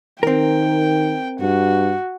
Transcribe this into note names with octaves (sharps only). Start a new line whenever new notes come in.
D#3 C4 A#4 G5
G2 F#4